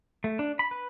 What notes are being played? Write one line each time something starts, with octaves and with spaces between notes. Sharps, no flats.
A3
D4
B5
B4